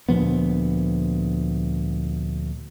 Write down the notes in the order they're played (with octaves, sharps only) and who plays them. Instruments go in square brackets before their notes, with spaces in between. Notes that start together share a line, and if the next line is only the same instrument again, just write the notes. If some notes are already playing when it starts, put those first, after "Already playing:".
[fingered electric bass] D2 A#2 F3 B3